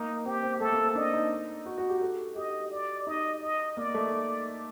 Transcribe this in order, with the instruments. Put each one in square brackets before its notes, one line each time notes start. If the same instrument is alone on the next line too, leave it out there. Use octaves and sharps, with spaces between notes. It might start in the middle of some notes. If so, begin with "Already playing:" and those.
Already playing: [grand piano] A#3 [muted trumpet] D#4
[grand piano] C4 [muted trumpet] G4
[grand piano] C4
[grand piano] A3 [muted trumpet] A4
[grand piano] A#3
C4
[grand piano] D4 [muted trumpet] D#5
[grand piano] D#4
F#4
F#4
G4
A4
[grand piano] G4 [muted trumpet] D#5
[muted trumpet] D5
[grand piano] D#4 [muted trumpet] D#5
[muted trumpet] D#5
[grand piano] A#3 [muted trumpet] D5
[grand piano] A3